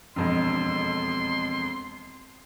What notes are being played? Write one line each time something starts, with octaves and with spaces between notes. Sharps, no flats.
E1 F2 D#5 C6